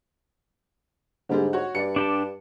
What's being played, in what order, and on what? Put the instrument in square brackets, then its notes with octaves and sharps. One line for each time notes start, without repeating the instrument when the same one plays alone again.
[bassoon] G#2 [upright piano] D3 G3 G#3
[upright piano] F#4 C#5
[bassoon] G2 [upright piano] D5 C#7
[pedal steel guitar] D4 G4 A5